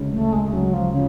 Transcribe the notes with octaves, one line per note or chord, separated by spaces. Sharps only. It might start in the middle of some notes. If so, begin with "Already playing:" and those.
Already playing: D2 C#3 G#3 C#4
D2 A3
G#3
C#3 F#3 G#3 C#4
F3
C#3